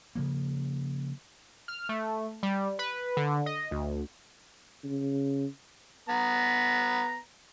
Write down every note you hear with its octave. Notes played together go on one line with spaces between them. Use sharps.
C#3 F3 A#3
F6
A3
G3
B4
D3
D#5
D2
C#3
B3 A#5